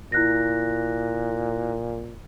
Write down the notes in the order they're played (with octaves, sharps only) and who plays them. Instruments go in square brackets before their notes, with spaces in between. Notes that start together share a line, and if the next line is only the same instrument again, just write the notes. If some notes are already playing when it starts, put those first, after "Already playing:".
[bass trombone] A#2 [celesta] E4 F#6 A#6